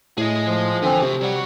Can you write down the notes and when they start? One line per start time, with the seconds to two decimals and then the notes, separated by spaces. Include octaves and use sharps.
0.18 A2 G#4 D#5
0.44 F3
0.82 D3 E3 C4 G#5
1.02 C3 F#4 C5
1.21 F#3 G3 F#5